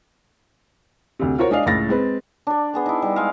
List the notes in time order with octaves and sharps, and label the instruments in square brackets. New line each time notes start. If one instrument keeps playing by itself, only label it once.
[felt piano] D2 C3
F4 F#4 A#4 C5 C#5
G#3 D4 G#4 D#5 F5
C#2 A2 A6 A#6
G#3 C4 B4
[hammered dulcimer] D4 D5
B3 G#4 C6
D#4 E4
G3
G#3 F5